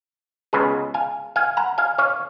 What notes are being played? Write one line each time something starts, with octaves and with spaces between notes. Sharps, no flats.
C#2 C#3 G#3 B3 G#4 B4
F5 G#5
F5 G#5
F#5 A#5
F5 G#5
C#5 F5